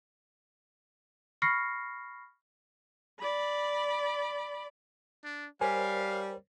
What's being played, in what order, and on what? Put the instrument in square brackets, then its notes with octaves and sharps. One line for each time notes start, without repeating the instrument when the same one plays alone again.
[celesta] B5 C#6 F6 A#6 C7 C#7
[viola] D5 B5
[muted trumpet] D4
[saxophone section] G3 [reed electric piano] A#4 C5 C#5 [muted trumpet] F5 [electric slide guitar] G#5